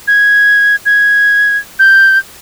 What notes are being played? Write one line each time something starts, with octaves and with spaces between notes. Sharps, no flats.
G#6
G#6
G6